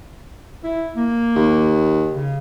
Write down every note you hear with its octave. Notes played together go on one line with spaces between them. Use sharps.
E4
A#3
D#2
C#3